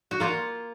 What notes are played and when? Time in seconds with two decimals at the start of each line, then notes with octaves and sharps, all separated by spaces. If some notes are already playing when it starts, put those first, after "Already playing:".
0.11 F#4
0.20 A#3 F4